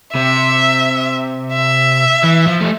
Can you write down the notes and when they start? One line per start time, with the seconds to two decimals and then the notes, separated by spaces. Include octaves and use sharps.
0.14 C3 E5
1.53 E5
2.23 E3
2.47 F3
2.61 A3